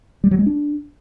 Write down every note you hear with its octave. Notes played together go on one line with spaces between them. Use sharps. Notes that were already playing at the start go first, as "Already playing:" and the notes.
G3
F#3
G#3
D4